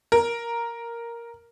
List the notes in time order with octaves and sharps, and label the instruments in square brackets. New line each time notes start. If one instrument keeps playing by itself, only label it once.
[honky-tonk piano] A#4